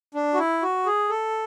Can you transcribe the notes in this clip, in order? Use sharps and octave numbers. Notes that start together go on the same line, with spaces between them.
D4
F#4
E4
F#4
G#4
A4